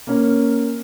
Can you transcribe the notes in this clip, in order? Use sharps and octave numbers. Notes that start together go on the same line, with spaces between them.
A#3 C#4